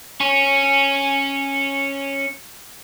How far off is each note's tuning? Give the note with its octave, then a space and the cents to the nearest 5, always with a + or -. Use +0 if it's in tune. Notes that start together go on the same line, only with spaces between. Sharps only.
C#4 -10 G#5 +0